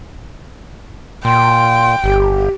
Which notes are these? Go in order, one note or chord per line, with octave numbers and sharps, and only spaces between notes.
A#2 G5 C6
G1 G4